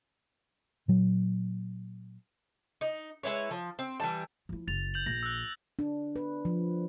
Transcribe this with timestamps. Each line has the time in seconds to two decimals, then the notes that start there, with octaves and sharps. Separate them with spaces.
0.88 A#2 F#3
2.81 D#4
3.23 G#3 E4 B4 C#5
3.51 F3
3.79 C4
4.00 E3 G3 A5
4.49 F3 E4
4.68 F#1 A6 F7
4.94 G6 F7 F#7
5.06 A#1 A#6
5.23 E6 F#6
5.79 D4
6.16 B4
6.45 F3